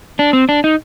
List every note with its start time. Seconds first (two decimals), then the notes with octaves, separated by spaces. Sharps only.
0.19 D4
0.33 C4
0.49 D4
0.64 D#4